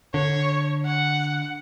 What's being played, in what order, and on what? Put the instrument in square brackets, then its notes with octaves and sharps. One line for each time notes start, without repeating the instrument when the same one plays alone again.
[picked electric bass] D3 [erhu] C#5
[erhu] F#5